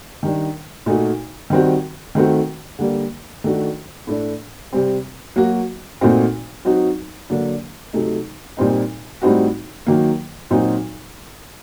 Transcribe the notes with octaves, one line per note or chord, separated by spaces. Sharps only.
D#3 G3 D4
A#2 A3 D#4 F#4
D#3 G3 C4 F#4
D#3 A3 C4 F#4
D3 G3 A#3
D#3 A3 D4 F#4
A2 A3 D4
C3 G3 C4
F#3 A#3 F#4
A#2 A3 C4 D#4 F#4
F#3 C4 D#4 F#4
D3 F#3 A#3 D4
C3 F#3 A3 D#4
A#2 G3 C4 D#4
A2 G3 C4 D#4 F#4
D#3 F#3 A#3
A#2 F#3 C4 D#4 F#4